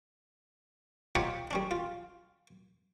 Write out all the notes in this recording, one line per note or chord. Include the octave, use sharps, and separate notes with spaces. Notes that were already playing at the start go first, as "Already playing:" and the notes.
D#4 F4 G4 C#5 F#5
G3 C#4 D4
F4